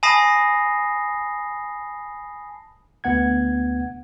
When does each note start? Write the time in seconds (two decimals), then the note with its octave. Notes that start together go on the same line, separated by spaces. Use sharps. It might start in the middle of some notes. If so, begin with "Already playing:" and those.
0.03 G#5 A5 B5 D#6 A#6 C7
3.04 D2 B3 F#5 G#6